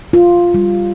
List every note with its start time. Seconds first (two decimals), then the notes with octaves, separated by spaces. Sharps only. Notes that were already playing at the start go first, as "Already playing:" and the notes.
0.13 F4
0.54 G3